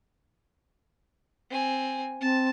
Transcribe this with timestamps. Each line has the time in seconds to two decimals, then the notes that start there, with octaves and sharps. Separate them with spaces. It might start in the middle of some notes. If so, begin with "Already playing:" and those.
1.51 C4 G#5
2.21 C4 A5